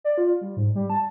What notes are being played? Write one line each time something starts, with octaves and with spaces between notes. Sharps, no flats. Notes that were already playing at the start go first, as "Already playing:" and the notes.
D5
F4
G3
G#2
G3
A5